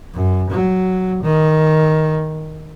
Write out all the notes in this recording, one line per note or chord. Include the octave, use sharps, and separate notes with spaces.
F#2
F#3
D#3